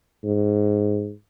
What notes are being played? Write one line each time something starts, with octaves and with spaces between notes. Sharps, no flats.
G#2